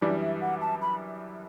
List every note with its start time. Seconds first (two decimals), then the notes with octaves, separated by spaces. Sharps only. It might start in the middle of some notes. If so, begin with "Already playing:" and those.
0.01 F#2 E3 G3 D4 D5
0.21 E5
0.41 F#5
0.61 A5
0.81 B5